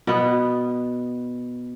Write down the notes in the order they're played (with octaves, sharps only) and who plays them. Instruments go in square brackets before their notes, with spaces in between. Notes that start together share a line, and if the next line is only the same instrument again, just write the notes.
[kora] B2 B3